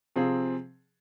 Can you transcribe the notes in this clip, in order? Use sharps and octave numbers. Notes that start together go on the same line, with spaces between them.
C3 F3 C4 G#4